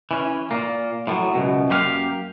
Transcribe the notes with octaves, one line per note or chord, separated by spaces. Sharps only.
E3 C#4
A#2 A#3
A2 E3 F#3
C#2 F#2 B2
F#2 A#3 G4 B4 F5